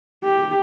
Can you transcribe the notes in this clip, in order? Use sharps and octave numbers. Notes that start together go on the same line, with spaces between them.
G4